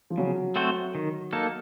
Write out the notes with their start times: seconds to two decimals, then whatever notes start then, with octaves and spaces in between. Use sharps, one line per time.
0.10 F3
0.18 C#3 F#3
0.56 A3 C4 F#4 C5
0.95 D#3
1.33 A#3 D#4 A4